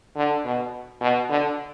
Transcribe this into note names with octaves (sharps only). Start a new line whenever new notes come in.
D3
B2
B2
D3